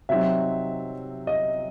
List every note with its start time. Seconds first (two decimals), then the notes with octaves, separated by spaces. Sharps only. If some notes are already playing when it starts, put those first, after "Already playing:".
0.09 C3 F#3 C4 D#4 E5
1.27 D#5